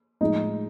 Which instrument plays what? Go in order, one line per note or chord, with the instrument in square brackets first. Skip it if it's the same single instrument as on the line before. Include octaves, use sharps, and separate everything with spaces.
[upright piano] A2 F3 G#3 D#4